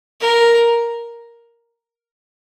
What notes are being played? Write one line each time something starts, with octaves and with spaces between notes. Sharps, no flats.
A#4